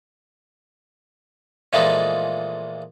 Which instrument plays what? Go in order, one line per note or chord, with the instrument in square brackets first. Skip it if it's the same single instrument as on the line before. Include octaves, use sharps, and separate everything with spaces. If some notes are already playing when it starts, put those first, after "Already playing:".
[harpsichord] A#2 E3 F3 G#3 A3 D#4